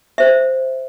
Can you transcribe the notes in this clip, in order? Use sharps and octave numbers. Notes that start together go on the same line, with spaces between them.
C5 E5